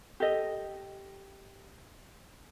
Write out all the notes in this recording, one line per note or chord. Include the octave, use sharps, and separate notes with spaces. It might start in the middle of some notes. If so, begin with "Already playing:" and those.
G4 A4 D#5